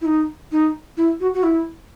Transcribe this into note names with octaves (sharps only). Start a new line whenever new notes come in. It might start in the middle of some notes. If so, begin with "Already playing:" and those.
E4
D#4
D#4
E4
F#4
F#4
E4